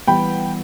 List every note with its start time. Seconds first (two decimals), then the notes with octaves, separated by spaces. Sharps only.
0.07 E3 G3 B3 G5 B5